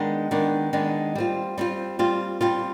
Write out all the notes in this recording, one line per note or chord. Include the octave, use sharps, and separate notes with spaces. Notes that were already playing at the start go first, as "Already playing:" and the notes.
Already playing: D#3 G#3 B3 D4
D#3 G#3 B3 D4
D#3 G#3 B3 D4
G3 C4 F4
G3 C4 F4
G3 C4 F4
G3 C4 F4